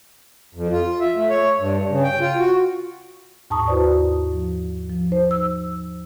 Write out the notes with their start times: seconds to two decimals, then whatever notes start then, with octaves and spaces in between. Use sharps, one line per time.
0.55 F2
0.72 F4
1.00 E5
1.16 A3
1.30 C#5
1.59 G2
1.90 C#3
2.03 G5
2.20 F4
2.39 F#4
3.50 D#2 G#2 A5 A#5 C#6 D#6
3.68 E4 F#4 B4 C5 D5
4.32 F3
4.90 F3
5.10 D#4 C5
5.31 E6